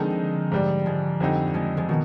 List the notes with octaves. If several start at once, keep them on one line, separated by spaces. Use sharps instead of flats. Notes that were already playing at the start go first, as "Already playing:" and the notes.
Already playing: D3 D#3 F3 G#3 C4 D#4
G#2 G3 D4
F3 G#3
F2 D3 G3 C4 D#4
F3 G#3
F3 G#3
B2 D#3